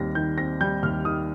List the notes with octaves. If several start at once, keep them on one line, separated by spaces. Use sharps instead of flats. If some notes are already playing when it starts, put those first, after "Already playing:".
Already playing: D#2 G3 C4 A#6
D#3 G6
C4 A#6
G3 G6
D#2 F6
D#3 D#6